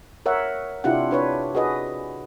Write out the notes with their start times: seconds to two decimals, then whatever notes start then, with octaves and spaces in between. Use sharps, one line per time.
0.26 A#4 C#5 E5 F#5
0.84 C3 D4 E4 F4 G4 F#5
1.11 D4 B4 C#5
1.55 F#4 G#4 B4 D#5